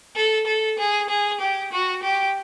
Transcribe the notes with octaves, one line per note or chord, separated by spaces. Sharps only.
A4
A4
G#4
G#4
G4
F#4
G4